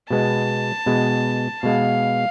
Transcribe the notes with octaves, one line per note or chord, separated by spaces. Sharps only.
B2 G#3 B3 A5
B2 G#3 B3
B2 G#3 B3 F5